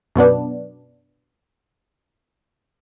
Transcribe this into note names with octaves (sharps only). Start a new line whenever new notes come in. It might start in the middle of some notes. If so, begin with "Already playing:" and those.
F#2 B2 B3 D4